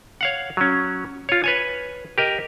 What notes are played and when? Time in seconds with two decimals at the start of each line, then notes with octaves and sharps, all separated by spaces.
0.21 C#5 F5 F#5
0.57 F#3 C#4
1.29 F4 C#5
1.44 B4 C#5 G#5
2.18 G4 A#4 D#5